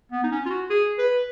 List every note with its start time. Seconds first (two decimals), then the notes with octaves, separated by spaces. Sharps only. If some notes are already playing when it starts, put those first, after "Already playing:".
0.12 B3
0.23 D#4
0.31 C#4
0.46 F4
0.50 F#4
0.70 G#4
0.98 B4